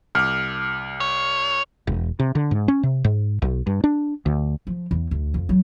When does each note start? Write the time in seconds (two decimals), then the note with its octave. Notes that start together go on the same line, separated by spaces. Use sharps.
0.15 C2 D6 F6
1.00 C#5
1.87 E1
2.19 C3
2.35 D3
2.51 G#2
2.68 C#4
2.83 C3
3.04 G#2
3.42 B1
3.67 G2
3.84 D4
4.26 D2
4.67 F3
4.91 E2
5.11 D2
5.34 F2
5.49 F#3